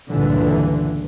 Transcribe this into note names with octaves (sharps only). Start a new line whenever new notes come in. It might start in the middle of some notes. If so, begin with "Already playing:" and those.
C#2 G2 A#2 D3 E3